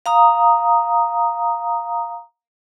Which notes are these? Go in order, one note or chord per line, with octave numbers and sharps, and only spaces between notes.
F5 A#5 D#6